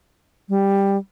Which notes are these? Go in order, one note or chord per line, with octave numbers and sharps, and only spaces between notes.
G3